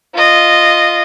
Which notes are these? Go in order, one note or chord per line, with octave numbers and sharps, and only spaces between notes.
F4 D#5